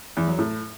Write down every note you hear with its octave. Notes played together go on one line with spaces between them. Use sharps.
E2
F#3
A2